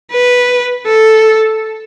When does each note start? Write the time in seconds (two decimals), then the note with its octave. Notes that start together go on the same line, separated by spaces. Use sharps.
0.11 B4
0.85 A4